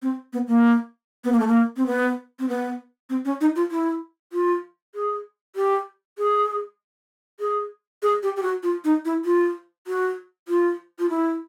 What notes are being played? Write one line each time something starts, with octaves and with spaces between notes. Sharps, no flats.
C4
B3
A#3
B3
A#3
A3
A#3
C4
B3
C4
B3
C4
C#4
D#4
F4
E4
F4
G#4
G4
G#4
G#4
G#4
G4
G4
F#4
F4
D#4
E4
F4
F#4
F4
F4
E4